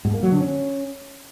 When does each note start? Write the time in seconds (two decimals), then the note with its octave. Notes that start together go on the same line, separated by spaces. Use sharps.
0.05 G#2
0.14 A#3
0.23 F#3
0.32 D3
0.41 C#4